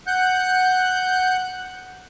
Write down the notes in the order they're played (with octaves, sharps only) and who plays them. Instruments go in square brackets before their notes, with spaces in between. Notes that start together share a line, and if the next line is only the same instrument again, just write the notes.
[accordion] F#5 F#6 G6